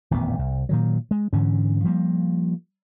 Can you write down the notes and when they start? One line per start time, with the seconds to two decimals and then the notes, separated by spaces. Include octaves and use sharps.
0.11 D#1 A1 F2 B3
0.39 C2
0.69 A#2 D#3 F#3
1.11 G#3
1.33 G#2 D3 E3 C#4
1.84 F3 G3 A#3